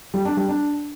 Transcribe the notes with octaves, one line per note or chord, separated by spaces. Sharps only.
G3
D4
G3
D4